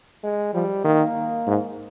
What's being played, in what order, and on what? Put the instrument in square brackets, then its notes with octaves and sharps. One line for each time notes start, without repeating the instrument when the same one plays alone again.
[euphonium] G#3
[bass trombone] F3 [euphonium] G3
[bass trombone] D#3 [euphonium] A#3
[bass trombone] G#2